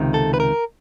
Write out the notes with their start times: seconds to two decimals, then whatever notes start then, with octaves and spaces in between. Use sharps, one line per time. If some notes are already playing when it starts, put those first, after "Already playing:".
Already playing: C#2 C3 D#3
0.14 A4
0.34 B4
0.40 A#4